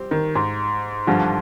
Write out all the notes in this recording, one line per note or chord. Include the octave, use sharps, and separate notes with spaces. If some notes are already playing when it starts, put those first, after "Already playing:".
Already playing: G3 C4 G4
D#3
G#2
G2 D3 F3